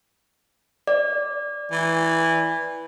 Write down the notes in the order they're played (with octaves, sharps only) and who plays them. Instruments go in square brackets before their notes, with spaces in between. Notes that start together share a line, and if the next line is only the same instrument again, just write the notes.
[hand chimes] D5
[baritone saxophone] E3